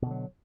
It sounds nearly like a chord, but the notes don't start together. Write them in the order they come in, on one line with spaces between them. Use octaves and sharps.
B2 D3 F#3